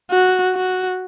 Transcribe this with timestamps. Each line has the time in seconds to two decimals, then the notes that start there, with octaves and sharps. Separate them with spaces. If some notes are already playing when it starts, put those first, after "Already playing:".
0.10 F#4
0.55 F#4